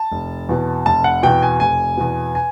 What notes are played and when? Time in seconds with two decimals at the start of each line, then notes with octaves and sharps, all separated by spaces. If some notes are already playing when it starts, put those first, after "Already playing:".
Already playing: A5
0.12 F1
0.49 E2 B2
0.86 F1 A5
1.04 F#5
1.23 E2 B2 G5
1.42 G#5
1.60 F1 G#5
1.97 E2 B2
2.35 G#5